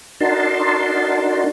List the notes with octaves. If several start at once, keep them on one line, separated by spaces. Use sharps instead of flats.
D4 D#4 F#4 A#4 A5 C6